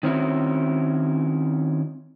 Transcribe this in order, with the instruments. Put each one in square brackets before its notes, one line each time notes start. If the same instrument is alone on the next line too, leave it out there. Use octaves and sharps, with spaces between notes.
[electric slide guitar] D#3 C4 C#4 E4 F#4